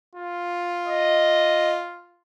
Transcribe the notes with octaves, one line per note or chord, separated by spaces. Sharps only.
F4
D#5